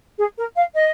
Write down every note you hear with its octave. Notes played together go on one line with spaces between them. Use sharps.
G#4
A#4
F5
D#5